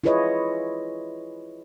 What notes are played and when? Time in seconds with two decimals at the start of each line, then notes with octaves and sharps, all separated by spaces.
0.04 E4 F4 G#4 B4 C#5 D#5